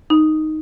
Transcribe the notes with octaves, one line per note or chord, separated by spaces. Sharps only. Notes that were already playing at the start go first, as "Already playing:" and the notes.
D#4